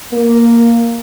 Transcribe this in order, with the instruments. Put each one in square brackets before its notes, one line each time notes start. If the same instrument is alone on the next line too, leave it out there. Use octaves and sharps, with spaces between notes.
[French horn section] A#3